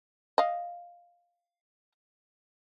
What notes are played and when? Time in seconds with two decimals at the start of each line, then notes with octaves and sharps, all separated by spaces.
0.38 D#5 F5